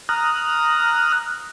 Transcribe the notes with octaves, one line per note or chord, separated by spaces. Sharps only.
A#5 D#6 F6 F#6